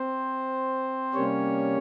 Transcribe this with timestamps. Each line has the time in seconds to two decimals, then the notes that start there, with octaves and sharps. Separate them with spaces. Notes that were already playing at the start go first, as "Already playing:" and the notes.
Already playing: C4 C5
1.14 C3 G3 A#3 C#4 C#5